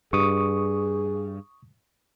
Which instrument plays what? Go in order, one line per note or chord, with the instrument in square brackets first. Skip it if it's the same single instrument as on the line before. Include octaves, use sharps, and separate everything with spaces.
[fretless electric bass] G2 [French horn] G#4 [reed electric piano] C#6 D#6